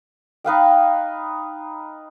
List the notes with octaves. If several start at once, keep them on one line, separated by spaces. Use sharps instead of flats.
D#4 B4 F5 G5